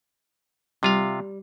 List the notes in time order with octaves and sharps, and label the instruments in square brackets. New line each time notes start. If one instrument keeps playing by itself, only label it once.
[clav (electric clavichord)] C3 F4 F5 [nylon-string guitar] G3